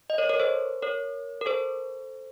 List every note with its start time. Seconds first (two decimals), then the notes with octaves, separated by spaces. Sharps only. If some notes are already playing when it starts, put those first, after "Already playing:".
0.10 D#5
0.18 A#4 C#5
0.29 A#4 C#5
0.39 A4 C5
0.82 A#4 C#5
1.41 A#4
1.46 A4 C5